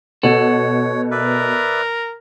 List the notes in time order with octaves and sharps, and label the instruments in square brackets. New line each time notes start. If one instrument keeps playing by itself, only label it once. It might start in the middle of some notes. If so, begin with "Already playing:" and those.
[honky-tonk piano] B2 [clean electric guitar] A4 F#5 [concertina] C#5
[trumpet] A#4 [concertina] B4 D5 E5